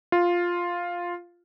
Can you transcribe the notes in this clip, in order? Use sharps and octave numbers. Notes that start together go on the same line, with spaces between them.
F4